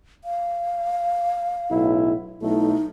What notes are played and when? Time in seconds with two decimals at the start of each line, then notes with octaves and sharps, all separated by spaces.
0.24 F5
1.71 B1 A2 E4
2.42 B1 A3 D#4 E4